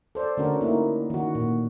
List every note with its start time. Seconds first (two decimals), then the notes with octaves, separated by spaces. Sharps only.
0.15 A4 C5 D5
0.37 D3 A3 C#4 F#4 A#4
0.61 A#3 D#4 E4
1.10 D#3 F#4
1.35 A#2